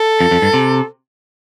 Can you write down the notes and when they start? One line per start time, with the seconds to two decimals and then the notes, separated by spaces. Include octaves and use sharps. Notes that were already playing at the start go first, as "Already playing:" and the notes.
Already playing: A4
0.20 F2
0.31 F2
0.42 G2
0.54 C3